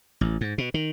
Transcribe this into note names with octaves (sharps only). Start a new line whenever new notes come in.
A1
G#2
B2
D#3